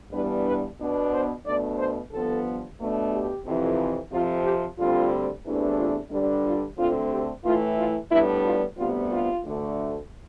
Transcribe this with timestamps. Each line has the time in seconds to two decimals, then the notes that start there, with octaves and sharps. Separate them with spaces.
0.12 G2 E3 G3 B3 D4 B4
0.45 B4
0.79 B2 B3 D4
1.13 C5
1.46 B2 A3 D4 D5
1.78 C5
2.12 G2 F3 B3 A4
2.79 B2 A3 D4
3.12 G4
3.45 F2 C3 E3
4.11 F2 C3 F3 F4
4.44 G4
4.78 D2 D3 G3 C4 F4
5.45 E2 C3 E3 A3 D4
5.79 F4
6.11 G2 D3 G3 D4
6.45 F4
6.77 D2 D3 A3 C4 F4
7.11 G4
7.44 A2 E3 A3 F4
7.78 F4
8.11 A2 G3 B3 D4 E4
8.44 F4
8.77 D2 C3 G3 B3 F4
9.11 F4
9.44 D2 D3 A3